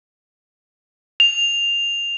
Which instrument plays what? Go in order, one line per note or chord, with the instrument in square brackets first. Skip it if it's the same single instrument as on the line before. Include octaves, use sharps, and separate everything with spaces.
[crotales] F7